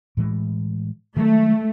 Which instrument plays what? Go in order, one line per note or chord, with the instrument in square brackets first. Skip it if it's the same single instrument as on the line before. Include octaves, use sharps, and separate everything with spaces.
[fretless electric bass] A2 E3 G#3
[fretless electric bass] D#3 F#3 G#3 [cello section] A3